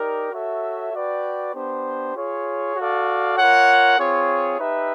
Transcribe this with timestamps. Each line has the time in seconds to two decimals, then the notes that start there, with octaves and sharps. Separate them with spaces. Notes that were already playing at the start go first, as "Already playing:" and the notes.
Already playing: D#4 G4 A#4 D5
0.32 F#4 A4 C#5 E5
0.93 F#4 B4 D5 G5
1.54 B3 D4 G4 C5
2.15 F4 G#4 C#5
2.76 F#4 A4 D5 F5
3.37 F4 A#4 C#5 F#5
3.98 C4 F4 G#4 C#5
4.59 D#4 G4 B4 E5